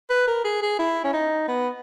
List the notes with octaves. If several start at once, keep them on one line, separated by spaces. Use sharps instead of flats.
B4
A#4
G#4
G#4
E4
C#4
D#4
B3